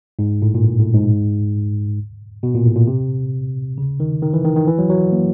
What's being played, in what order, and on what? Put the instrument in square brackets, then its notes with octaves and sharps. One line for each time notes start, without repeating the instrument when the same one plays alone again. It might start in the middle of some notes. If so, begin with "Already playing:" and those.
[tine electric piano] G#2
A2
A#2
A2
A2
G#2
B2
A#2
A2
A#2
C3
C#3
D#3
D#3
E3
D#3
D#3
E3
F#3
F#3
A#3